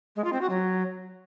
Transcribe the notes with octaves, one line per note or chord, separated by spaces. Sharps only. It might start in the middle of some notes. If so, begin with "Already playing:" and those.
G#3
F4
C4
F#4
F#3